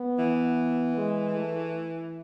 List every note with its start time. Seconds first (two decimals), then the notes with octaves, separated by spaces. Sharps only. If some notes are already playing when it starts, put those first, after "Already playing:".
Already playing: B3
0.19 E3
0.98 G#3
1.36 A3